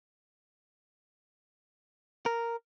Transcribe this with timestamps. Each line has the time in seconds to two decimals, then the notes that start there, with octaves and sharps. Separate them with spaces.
2.26 A#4